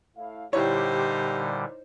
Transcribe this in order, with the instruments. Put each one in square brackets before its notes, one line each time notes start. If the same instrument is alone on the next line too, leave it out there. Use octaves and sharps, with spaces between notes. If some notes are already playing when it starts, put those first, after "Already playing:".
[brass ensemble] A2 E4 F5
[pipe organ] A#2 D3 G3 [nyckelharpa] D#4 C5 [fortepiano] E4 C#5 [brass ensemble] G4